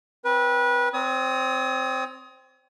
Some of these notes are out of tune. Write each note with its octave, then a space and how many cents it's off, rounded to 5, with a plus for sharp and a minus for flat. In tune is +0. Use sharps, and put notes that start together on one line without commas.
C4 +10 B4 -25
C4 +0 C#5 +35 D#6 +25